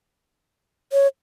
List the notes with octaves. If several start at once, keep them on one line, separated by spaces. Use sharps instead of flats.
C#5